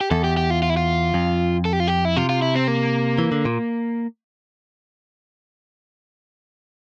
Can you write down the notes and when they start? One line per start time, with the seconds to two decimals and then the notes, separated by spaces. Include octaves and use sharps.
0.01 G4
0.11 E2 A4
0.24 G4
0.37 G4
0.50 F4
0.62 F4
0.70 E4
0.77 F4
1.14 F2
1.65 A4
1.73 G4
1.80 F4
1.87 G4
2.05 E4
2.16 C3 F4
2.29 F4
2.42 E4
2.56 C4
2.68 A#3
3.18 E3
3.32 D3
3.45 A#2